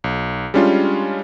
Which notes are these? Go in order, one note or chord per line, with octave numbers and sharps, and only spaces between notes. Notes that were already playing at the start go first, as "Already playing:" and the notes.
B1
G3 G#3 C#4 D4 F4